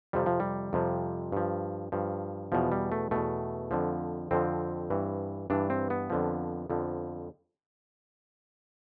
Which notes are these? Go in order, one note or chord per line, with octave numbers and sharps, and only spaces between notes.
F2 C3 F3 G3
F3
G3
F2 C3 F3
G2 F3
G2 F3
E2 B2 F3
G3
A3
E2 B2 A3
F2 D3 F3
F2 D3 F3 C4
G2 E3
G2 E3 D4
C4
B3
F2 D3 F3
F2 D3 F3